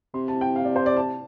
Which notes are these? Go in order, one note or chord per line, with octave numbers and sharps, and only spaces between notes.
C3 C6
A5
G5
F5
D5
C5
D5
A5